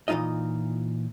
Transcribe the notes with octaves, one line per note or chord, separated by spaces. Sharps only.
A#2 E3 G3 D#4 F4 D#5